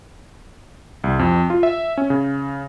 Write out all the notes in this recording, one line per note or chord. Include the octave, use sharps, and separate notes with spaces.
C2
F2
F4
E5
C#4
C#3